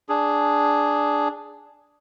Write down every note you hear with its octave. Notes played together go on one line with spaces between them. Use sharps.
D4 G#4